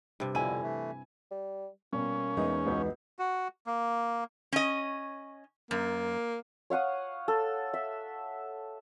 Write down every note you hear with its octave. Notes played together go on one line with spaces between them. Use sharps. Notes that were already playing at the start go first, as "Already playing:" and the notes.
G2 C3
F2 B2 D3 E4 G#5 D#7
E3 A3
G3
B2 G3 A#3 C#4
E2 G#3 D#4
C#2 B3 F#4 G6
F#4
A#3
C#4 D#5
F#2 A#3
C#5 F5 F#5 D#6
A4
E5